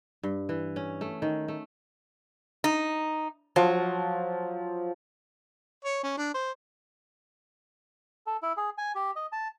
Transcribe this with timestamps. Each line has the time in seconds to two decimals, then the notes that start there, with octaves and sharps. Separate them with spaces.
0.23 G2
0.49 E3
0.76 C#4
1.01 A3
1.22 D#3
1.48 A3
2.64 D#4
3.56 F3 F#3
5.85 C#5
6.03 C#4
6.17 D4
6.34 C5
8.27 A4
8.42 E4
8.57 G#4
8.78 G#5
8.95 G4
9.16 D#5
9.32 A5